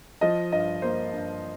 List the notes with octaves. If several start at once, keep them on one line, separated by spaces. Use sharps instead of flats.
F3 D#5
G2 D#5
A#3 C5
G2